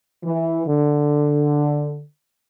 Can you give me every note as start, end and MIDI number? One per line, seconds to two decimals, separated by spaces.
0.24 0.63 52
0.67 2.04 50